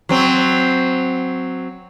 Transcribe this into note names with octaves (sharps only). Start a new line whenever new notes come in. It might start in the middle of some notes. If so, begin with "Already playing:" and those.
F#3 C4